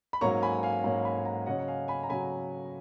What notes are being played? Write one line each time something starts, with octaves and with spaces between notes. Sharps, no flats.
B5
G#2 F#3 A#3 C#4 A#5 C#6
G#5 B5
F5 G#5
G#2 F#3 A#3 C#4
G#5 B5
F#5 A#5
C#3 F#3 C#4 D#5 F#5
F#5
F5 G#5
G#5 B5
A#5
C#3 F#3 C#4 G#5 B5